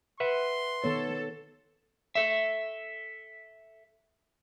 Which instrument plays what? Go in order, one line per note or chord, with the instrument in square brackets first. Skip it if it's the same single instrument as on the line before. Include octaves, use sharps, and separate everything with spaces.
[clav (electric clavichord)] B4 E5 F#5 [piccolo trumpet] C6
[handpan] D#3 B3 C#5 [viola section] A4
[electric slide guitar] A4 E5